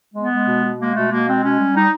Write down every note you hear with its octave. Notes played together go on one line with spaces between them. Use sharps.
G#3 B3
G#3
B2
B2
G#3 A#3
B2 A3
B2 A#3
G#3 C4
B2 C#4
G3
G3 D#4